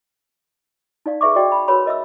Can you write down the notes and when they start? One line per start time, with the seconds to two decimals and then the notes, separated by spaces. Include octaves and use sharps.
1.06 D#4 D5 F5
1.21 G#4 B4 E5 C#6 D6
1.36 F#4 D5 D#5 G5
1.52 B5
1.68 F#4 A#4 B4 C#5 B5
1.86 A#4 D#5 E5 E6